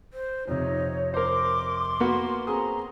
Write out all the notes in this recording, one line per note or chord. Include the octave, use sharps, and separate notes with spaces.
C5
F2 C3 D#4 C#5
A#4 C5 C6 D6
A#3 B3 F#4
C4 G#4 A#5 D#6